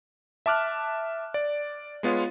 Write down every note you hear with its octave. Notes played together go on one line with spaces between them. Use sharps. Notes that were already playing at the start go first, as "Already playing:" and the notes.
E5 A5 D6 F6 F#6
D5
G#3 B3 F4 C#5